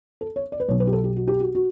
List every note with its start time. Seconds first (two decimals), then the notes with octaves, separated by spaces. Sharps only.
0.21 A4
0.36 C#5
0.52 D5
0.60 B4
0.68 B1 B2 F#3 C#5
0.80 B4
0.87 G4
0.93 A4
1.04 G4
1.16 F#4
1.27 G4
1.40 F#4
1.55 F#4